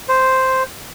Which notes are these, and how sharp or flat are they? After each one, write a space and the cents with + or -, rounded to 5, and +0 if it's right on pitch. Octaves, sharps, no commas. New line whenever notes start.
C5 -5